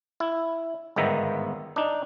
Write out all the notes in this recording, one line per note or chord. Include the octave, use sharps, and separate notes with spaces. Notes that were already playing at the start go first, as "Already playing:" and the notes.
E4
G1 G#2 D#3 B3 E5 A#5
D4 D#4